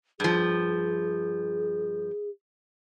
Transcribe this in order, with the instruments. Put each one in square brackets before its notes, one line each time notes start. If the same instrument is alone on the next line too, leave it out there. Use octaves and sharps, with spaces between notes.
[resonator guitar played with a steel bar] G2 F3 [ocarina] G#4